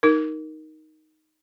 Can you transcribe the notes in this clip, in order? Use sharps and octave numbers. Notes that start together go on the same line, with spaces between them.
D#4 A#4